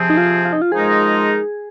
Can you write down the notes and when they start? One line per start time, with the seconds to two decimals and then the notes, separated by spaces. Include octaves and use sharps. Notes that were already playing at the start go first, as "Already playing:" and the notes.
Already playing: C3 F3 C4 G#4
0.10 D#4
0.17 F4
0.45 F4
0.53 D#4
0.62 F4
0.72 F3 G#3 D#4 G#4 A#4